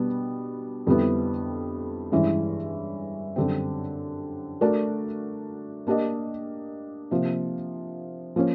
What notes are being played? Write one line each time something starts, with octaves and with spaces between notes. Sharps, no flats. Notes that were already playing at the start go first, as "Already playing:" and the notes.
Already playing: B2 G3 B3 D4
F2 D3 G3 B3 E4
G2 E3 G#3 C#4 E4
F#2 D3 G3 C4
A3 D4 F#4 A#4 D5
A#3 D4 G4 A#4 D#5
C3 F3 A#3
F3 A#3 C#4